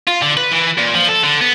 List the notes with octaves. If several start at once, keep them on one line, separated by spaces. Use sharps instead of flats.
F4
D3
B4
E3
A#2
F3
A4
D3
B3